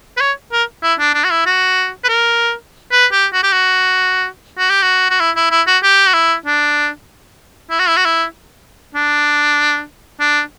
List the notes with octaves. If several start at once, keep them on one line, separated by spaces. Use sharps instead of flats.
B4
C#5
A#4
E4
D4
D4
F#4
E4
F#4
B4
A#4
B4
G4
F#4
G4
F#4
F#4
G4
F#4
F#4
E4
E4
E4
F#4
G4
F#4
E4
D4
E4
F#4
E4
F#4
E4
D4
D4